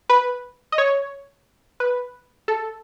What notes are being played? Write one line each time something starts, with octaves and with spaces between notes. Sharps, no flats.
B4
D#5
C#5
B4
A4